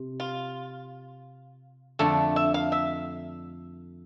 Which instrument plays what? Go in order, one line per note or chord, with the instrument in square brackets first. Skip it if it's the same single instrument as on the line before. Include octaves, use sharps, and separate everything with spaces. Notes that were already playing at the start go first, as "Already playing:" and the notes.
Already playing: [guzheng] C3
[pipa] F4
[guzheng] F2 D3 A3 D4 [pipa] A4
[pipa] E5
F5
E5